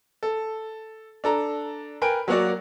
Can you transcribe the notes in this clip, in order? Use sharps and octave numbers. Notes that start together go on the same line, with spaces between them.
A4
D4 A4 A#5
A#4 B4 G5 G#5 D7
F#3 A#3 F#4 D5